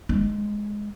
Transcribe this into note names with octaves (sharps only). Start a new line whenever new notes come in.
G#3